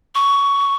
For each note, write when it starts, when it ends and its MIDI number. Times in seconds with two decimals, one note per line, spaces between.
0.15 0.76 85